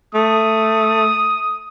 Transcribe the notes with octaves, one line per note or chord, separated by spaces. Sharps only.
A3 D#6